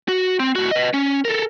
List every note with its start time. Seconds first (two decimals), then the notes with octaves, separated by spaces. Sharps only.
0.08 F#4
0.40 C4
0.55 A2 F#4
0.71 B4 D#5
0.94 C#4
1.25 A4 A#4